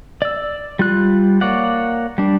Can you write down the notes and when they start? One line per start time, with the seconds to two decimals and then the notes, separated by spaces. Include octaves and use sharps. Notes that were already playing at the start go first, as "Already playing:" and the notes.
0.22 D5 E6
0.79 G3 F4 F#6
1.41 A#3 C#5 D5 F#5
2.18 G3 D4